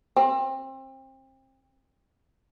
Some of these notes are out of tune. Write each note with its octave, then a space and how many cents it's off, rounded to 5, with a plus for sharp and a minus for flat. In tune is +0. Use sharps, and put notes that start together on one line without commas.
C4 +30